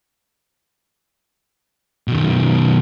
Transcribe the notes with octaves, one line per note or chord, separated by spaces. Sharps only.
B2 D#3